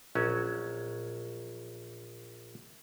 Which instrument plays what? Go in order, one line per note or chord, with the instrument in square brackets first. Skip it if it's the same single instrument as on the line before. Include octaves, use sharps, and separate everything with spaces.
[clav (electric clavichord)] A#1 F#3 C#4